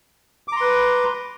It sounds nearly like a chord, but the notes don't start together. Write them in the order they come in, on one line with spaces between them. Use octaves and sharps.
D6 A#5 C6 B4